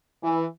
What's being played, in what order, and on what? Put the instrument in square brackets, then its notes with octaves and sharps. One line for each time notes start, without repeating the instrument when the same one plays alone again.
[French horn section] E3